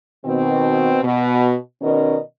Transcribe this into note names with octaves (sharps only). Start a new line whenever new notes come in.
B2 D#3 C4
B2
B2 D#3 C#4 A#4 D5 D#5